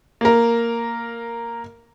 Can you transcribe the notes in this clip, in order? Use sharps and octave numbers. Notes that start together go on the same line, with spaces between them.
A#3 A#4